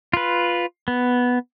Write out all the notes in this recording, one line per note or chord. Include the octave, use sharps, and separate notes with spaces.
F4 B4
B3